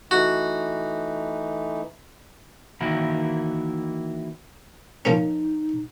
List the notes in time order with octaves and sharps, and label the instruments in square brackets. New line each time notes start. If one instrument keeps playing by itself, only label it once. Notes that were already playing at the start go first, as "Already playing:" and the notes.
[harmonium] E3 A3 D#4 [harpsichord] F#4
[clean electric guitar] D#3 E3 A#3 E4 F#4 A#4
[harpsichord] F3 A#3 C#4 [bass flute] D#4